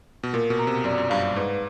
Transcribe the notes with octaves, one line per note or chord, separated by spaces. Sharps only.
B2
A#2 A#4
B2
A#5
C3
F#2 D5
F#2
G2 F5
G2
G#2 B4